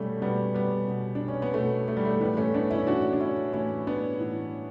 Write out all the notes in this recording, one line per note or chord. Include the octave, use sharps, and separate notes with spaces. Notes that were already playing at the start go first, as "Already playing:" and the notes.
Already playing: B2 G3 A3 C#4
B2 G3 B3
G3 B3
B2
D4
C#4
B3
B2 A3
A3
G3
A3
A2 E3 G3 B3
A3 C#4
B3 D4
C#4 E4
A2 E3 D4 F#4
D4
C#4 E4
A2 E3 C#4 E4
B3 D4
A2 E3